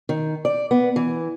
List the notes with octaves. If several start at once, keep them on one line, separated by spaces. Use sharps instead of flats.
D#3
D5
B3
E3